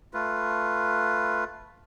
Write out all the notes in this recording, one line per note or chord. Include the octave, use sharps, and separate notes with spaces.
A3 F4 B4